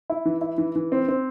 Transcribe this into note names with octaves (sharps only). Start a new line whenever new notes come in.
E4
E3
E4
E3
E3
C4
C4